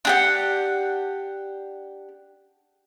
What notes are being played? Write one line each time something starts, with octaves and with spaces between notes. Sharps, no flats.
D4 G4 F#5